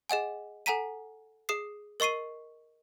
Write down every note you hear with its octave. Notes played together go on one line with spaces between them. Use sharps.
G#4 D#5 F#5 G#5
A4 F#5 G#5 A#5 B6 D#7
G#4 D#6 C7
A#4 D#5 C#6 C7 D#7